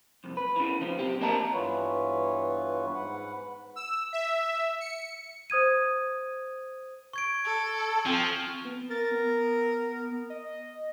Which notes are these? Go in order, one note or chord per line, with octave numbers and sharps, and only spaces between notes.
C2 F2
B4
C#3 E3
C#3 F3
B1 C4 G4
A#3 A#4 D#5 A5 A#5
G2 E3 B3 F4 B4 C#5
G#2 B4 F#5
E6
E5
C#7
C5 D#6 G#6 D#7
C#6 G#6 D7
A4
F3 C4 G5
B3
A#4 A6
B3
D#5